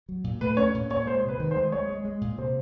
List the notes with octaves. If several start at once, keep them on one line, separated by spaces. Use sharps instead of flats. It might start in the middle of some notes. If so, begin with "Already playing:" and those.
F#3
A#2
A3 B4
C#4 C#5
A#2
A#2 C#5
G#3 C5
C3
B4
D#3
C5
G#3
G#3 C#5
G#3
G#3
A#2
C3 C5